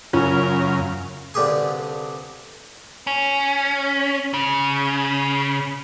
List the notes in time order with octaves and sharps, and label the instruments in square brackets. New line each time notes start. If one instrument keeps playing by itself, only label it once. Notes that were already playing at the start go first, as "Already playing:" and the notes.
[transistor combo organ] F#2 C#3 [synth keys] C#4 [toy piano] F4 [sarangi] A#4
[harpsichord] C2 G2 D3 G4 G#4 G#5
[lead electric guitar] C#4
C#3